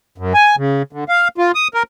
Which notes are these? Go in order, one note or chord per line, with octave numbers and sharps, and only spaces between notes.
F#2
G#5
C#3
D3
F5
F4
D#6
A#4